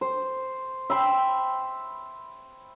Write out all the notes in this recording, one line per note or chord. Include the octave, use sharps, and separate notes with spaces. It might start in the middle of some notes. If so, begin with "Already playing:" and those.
C5
E5 G5 B5 C6